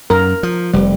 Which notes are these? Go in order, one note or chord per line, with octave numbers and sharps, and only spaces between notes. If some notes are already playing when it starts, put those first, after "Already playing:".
F#2 A#4
F3
F1 G3